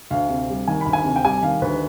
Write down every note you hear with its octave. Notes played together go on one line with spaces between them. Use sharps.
D2 F5
C3
G3
D#3 G#5
D2 B5
G#5
C3
G5
G3 G#5
D#3 F5
D2 B4